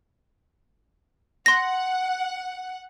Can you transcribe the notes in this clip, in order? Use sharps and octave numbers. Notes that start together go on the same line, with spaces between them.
F#5 C6 A#6